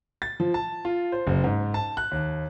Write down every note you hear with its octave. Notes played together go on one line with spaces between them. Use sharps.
A6
F3
A5
F4
C5
F#1
G#2
A5
F#6
D#2